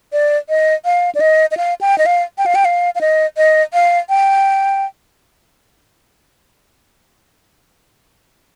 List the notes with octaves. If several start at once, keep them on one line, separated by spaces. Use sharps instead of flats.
D5
D#5
F5
D5
D#5
D#5
F5
G5
D#5
F5
G5
F5
G5
F5
F5
D#5
D#5
F5
G5